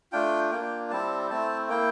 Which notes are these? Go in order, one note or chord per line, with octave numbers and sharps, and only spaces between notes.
A3 D4 F4 G5
A#3 D4 F4 G5
G3 C4 E4 A5
A3 C4 E4 A5
A#3 E4 G5